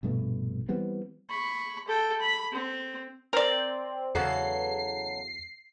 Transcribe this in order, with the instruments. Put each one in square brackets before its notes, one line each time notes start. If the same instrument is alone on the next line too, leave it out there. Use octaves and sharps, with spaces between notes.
[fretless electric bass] A#1 G2 B2 A3
E3 G3 B3 C4
[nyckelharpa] B5 C#6
A4 G5
B5
C4
[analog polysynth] C4 [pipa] A#4 D5
[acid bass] E2 [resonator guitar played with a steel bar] C#3 F#3 A4 [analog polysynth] C7